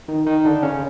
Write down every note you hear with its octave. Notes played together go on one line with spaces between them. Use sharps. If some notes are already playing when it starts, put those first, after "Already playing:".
D#3 D#4
D#3 D#4
D3 D4
C#3 C#4